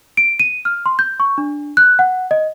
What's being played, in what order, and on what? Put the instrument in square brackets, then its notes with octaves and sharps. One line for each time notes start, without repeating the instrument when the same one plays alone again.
[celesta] D7
D#7
F6
C6
G6
C#6
D4
F#6
F#5
D#5